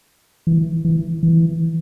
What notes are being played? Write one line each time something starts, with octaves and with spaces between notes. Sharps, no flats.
E3
E3
E3